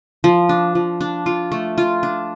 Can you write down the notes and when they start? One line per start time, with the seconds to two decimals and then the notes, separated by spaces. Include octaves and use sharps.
0.24 F3
0.49 D4
0.75 F3
1.01 D4
1.26 F4
1.52 A3
1.78 F4
2.03 D4